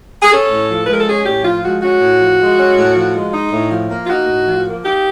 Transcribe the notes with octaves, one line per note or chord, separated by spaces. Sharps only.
G#4
C#4 A4
A2
F3
B4
G#3 A#4
A4
C#4 G#4
A2 G4
F3 F4
G#3 F#4
C#4 F#4
A2
F3
G#3
C#4
A2
F3
G#3
D#4
A2
F3
A#3
F4
D#4 F#4
A2
F3
A#3
D#4 G4